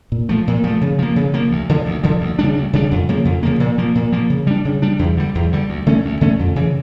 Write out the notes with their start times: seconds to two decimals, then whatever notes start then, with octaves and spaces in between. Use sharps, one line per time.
0.12 A#2
0.29 F3 A3
0.48 A#2
0.64 F3 A3
0.81 C#3
0.99 F3 A#3
1.16 C#3
1.34 F3 A#3
1.51 D2
1.69 D3 F3
1.86 D2
2.04 D3 F3
2.21 D2
2.39 C#3 G3 D4
2.55 D2
2.73 C#3 G3 D4
2.91 F2
3.09 C#3 F3 A#3
3.25 F2
3.43 C#3 F3 A#3
3.60 A#2
3.78 F3 A#3
3.95 A#2
4.12 F3 A#3
4.30 C#3
4.47 G3 D4
4.65 C#3
4.82 G3 D4
4.99 E2
5.17 D3 G3
5.35 E2
5.53 D3 G3
5.69 D2
5.86 D3 A3 C#4
6.05 D2
6.21 D3 A3 C#4
6.39 F2
6.56 C#3 E3